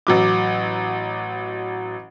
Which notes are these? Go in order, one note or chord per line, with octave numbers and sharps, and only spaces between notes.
A1 F#3 D6